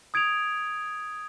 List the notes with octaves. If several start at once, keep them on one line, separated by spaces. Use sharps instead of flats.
D#6 G#6 D7 F7